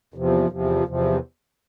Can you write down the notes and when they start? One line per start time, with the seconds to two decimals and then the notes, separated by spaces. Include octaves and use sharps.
0.14 E2 C3 F3
0.49 E2 C3 F3
0.84 E2 C3 F3